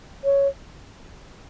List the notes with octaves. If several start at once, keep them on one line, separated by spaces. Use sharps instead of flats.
C#5